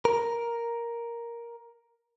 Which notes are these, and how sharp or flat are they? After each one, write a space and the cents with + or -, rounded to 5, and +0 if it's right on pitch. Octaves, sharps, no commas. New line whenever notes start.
A#4 +5